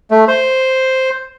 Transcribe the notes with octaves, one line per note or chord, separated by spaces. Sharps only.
A3
C5